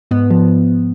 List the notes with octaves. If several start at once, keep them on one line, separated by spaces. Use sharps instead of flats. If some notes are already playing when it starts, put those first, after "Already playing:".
G#2 B3
F3